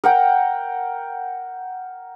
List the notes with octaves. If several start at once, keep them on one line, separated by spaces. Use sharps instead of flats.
A#4 F#5 G5